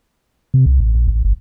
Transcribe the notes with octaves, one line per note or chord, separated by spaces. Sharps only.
C3
C2
A1
A#1
A1
G1